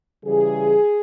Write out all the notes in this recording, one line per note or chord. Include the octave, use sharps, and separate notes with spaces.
C#3 E3 G3 G#4